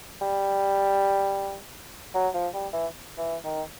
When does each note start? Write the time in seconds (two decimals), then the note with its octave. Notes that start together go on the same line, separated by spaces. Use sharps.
0.21 G3
2.15 F#3
2.34 F3
2.54 G3
2.73 E3
3.18 E3
3.44 D#3